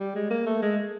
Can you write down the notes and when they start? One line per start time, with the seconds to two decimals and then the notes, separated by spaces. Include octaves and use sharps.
0.01 G3
0.16 G#3
0.30 A#3
0.46 A3
0.62 G#3